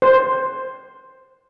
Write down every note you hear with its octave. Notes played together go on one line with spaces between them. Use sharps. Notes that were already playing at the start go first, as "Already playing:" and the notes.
C5